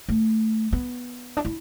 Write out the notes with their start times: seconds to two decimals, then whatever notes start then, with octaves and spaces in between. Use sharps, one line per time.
0.09 A3
0.73 B3
1.37 D4
1.45 E4